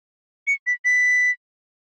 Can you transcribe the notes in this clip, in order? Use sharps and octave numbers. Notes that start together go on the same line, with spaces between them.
C#7
B6
B6